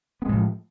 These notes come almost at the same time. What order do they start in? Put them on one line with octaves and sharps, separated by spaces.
B3 G#3 A2 F3